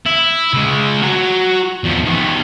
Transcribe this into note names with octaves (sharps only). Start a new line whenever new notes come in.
E4
C#3 G#3
F#4 A#5
E2 F3
D#3 B3